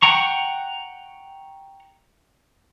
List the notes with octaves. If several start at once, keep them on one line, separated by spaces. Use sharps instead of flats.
F#5 G5 A#5 C#6